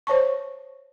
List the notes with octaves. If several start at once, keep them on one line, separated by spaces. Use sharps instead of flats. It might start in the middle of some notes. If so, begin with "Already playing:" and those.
C5 C#5 A5 C#6